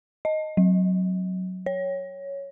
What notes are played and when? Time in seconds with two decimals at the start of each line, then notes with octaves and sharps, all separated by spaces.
0.25 D#5
0.57 F#3
1.66 C#5